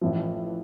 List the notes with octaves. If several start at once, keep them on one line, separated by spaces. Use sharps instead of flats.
A1 A2 E3 F3